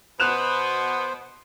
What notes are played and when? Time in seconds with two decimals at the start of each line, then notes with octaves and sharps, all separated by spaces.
0.20 B2 B3 C5 F#6 E7 F7